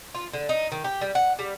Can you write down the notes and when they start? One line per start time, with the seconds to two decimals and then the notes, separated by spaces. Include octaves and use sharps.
0.15 F4
0.33 D3
0.49 D#4
0.72 D#3
0.84 G4
1.01 G3
1.15 F#5
1.39 G3